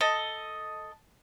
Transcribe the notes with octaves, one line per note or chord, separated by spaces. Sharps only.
A4 D#5